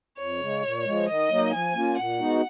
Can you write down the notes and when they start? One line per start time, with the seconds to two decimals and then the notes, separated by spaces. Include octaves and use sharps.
0.18 F2 C#5
0.40 C#3 G#3
0.62 A#2
0.85 F3 G#3
1.07 D#3 D#5
1.29 F#3 A#3 D#4
1.51 F3 G#5
1.74 A#3 C#4 F4
1.97 A#2 F#5
2.19 G#3 B3 D#4 F#4